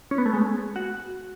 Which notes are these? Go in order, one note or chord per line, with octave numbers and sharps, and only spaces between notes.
C#4
B3
A3
G#3
F#4